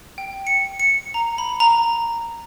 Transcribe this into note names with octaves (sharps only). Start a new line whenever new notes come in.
G5
C#7
C#7
A#5
B5
A#5